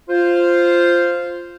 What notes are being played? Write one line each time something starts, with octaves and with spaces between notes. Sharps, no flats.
F4 C5